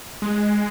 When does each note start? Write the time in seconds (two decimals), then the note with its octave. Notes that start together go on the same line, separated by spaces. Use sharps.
0.22 G#3